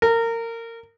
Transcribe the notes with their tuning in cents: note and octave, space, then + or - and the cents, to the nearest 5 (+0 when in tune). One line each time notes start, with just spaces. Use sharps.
A#4 -25